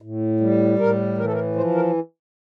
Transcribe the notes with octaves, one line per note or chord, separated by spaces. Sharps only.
A2
G3
A2 A#4
E3 A#4
A4
A#4
F3 C5
A#4